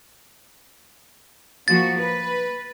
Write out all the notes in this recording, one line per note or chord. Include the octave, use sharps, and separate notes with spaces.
F3 A#3 F#4 A6
B4